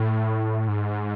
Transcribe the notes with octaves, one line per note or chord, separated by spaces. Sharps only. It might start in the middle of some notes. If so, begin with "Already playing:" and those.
Already playing: A2
G#2